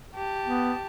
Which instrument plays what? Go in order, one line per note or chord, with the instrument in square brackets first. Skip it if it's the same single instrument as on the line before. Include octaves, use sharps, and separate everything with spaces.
[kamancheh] G4 A5
[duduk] B3